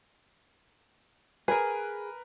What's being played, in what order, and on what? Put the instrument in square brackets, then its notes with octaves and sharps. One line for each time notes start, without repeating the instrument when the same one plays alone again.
[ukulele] G#4 [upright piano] A#4 B4